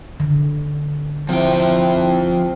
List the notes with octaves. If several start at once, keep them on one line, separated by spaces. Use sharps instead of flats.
D3
C3 F3 E4 G5